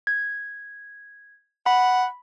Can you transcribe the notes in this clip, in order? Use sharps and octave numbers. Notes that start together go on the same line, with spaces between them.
G#6
F#5 B5